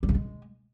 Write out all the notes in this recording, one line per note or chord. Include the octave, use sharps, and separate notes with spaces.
G3
C#3
G#3